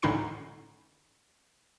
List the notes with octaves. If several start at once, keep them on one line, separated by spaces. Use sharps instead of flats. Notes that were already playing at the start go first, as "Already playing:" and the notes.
A2 D3 C#4 D#4 B5 C7